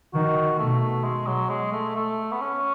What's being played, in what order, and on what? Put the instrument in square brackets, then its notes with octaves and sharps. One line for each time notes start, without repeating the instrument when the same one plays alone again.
[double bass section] D#3 [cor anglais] F#4
[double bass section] B2 [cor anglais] A3
[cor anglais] G#3
F#3
G#3
A3
A3
B3
C#4